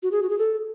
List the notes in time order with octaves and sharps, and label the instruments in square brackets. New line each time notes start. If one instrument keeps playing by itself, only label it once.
[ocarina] F#4
G#4
F#4
G#4
A4